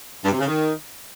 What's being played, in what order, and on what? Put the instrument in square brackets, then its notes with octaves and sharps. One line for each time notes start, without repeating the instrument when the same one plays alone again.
[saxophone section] G2
C3
C#3
D#3